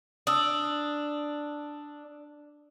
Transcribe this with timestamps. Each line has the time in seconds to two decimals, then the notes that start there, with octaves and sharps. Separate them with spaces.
0.27 D4 D#6 E6